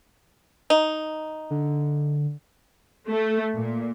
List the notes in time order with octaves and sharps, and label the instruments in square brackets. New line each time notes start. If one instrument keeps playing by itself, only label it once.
[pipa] D#4
[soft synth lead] D3
[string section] A3
A#2